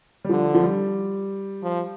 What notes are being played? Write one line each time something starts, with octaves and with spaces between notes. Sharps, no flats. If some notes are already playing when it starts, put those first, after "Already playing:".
G3
D3 F3
F3
G3
F3